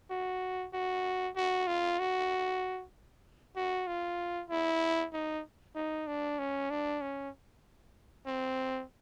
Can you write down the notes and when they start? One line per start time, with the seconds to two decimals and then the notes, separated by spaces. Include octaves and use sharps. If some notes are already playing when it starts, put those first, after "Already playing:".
0.10 F#4
0.73 F#4
1.36 F#4
1.67 F4
1.99 F#4
3.56 F#4
3.87 F4
4.50 E4
5.13 D#4
5.75 D#4
6.07 D4
6.39 C#4
6.70 D4
7.01 C#4
8.27 C4